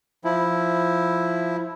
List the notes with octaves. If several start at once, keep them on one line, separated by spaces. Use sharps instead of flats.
F3 E4